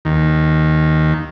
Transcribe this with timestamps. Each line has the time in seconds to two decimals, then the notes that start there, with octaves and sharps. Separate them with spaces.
0.05 D#2